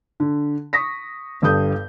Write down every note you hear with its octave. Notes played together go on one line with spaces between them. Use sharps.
D3
C#6 D#6 A#6 B6
G1 G2 A4 D#6 G6